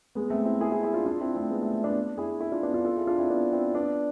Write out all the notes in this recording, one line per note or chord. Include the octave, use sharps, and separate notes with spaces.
G#3 B3
A3 C4
C4 E4
E4 G#4
E4 G#4
E4 G#4
D4 F4
D4 F4
C4 E4
A3 C4
G#3 B3
A3
A3
B3 D4
E4 G#4
E4 G#4
D4 F4
B3 D4
D4 F4
F4 A4
E4 G#4
D4 F4
C4 E4
B3 D4
C4 E4
B3 D4